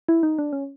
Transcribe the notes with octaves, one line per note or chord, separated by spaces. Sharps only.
E4
D#4
D4
C#4